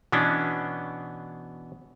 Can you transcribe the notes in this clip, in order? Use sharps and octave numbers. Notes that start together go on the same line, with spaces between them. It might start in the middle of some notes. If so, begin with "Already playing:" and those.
B2 E3 B3 C#4 D4